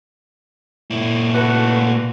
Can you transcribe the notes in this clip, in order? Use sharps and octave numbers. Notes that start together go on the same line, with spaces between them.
A#2 E4
A3 F#4 B4